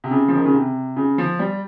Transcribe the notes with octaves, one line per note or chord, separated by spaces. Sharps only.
C3
C#3
F3
D#3
C#3
C3
C#3
F3
G3